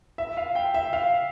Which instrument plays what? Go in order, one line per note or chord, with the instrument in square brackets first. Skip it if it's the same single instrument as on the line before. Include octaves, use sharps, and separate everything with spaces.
[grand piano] E5
F5
G5
E5
F5